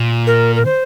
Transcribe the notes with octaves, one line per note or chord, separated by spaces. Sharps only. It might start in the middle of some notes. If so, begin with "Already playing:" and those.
Already playing: A#2
A#4
A#4
C5